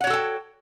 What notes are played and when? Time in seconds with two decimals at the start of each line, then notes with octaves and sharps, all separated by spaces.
0.01 F#5
0.04 C#5
0.07 F#4
0.10 A4
0.13 G5